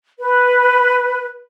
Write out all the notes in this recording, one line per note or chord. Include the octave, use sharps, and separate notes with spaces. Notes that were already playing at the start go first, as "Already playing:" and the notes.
B4